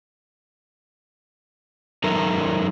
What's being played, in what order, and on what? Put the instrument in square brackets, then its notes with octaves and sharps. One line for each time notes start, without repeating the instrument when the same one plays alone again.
[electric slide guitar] F#3 D#4 A4 A#4 E5 A#5